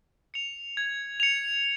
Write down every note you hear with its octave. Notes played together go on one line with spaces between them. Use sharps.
C#7 F7
G#6
C#7 F7